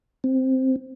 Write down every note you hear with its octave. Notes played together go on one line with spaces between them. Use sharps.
C4